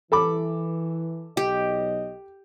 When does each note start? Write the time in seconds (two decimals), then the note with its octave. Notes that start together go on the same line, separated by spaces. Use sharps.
0.12 E3 A4 B5 D6
1.37 B1 G4 D#5